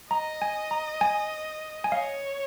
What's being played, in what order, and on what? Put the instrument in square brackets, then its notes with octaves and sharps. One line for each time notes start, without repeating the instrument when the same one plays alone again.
[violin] D#5 [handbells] A#5
[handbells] G#5
A#5
G#5
G#5
[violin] C#5 [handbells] F5